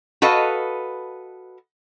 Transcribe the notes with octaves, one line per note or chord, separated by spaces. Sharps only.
F#4 A4 B4 D#5 F5